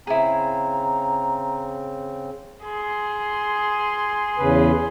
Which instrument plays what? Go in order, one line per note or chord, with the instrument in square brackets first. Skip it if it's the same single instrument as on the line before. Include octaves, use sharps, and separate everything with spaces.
[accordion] C#3 C4 [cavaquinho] E4 G#4 [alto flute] A#5
[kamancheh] G#4 C6
[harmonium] E2 C#3 B4